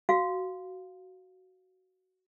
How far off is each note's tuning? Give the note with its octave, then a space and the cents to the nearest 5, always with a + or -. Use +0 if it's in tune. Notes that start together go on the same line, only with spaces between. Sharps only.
F#4 +10 F5 +0